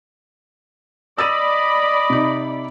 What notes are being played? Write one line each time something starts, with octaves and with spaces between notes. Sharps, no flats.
D5 D#5 B5 E6 A6 D#7
C3 D#4